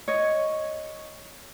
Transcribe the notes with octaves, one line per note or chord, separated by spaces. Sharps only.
C#5 D#5